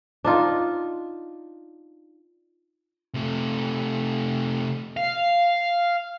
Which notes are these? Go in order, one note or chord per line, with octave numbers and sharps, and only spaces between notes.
D4 D#4 F4
C3 A3
F5